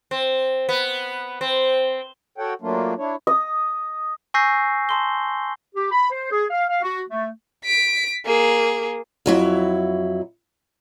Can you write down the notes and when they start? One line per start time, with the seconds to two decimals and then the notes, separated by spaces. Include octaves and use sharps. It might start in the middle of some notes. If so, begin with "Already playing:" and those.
0.11 C4
0.69 B3
1.41 C4
2.38 F#4 A4 C#5 F#5 G5
2.61 F#3 A3 A#3 D4 F4
2.98 D4 E4 C#5
3.27 D#5
4.34 G#5 C#6 E6 G6 A#6 C7
4.89 A5 C6 G7
5.75 G4
5.91 B5
6.10 C5
6.31 G#4
6.50 F5
6.69 F5
6.82 F#4
7.09 A3
7.64 B6 D7
8.25 A#3 G#4
9.26 F2 F#3 E4